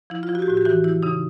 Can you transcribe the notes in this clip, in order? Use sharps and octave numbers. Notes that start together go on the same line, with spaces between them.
F3 E4
F4
F3
F#4
G4
A2 F#4
G4
E3 F#4
E3 E4
C#3 D#4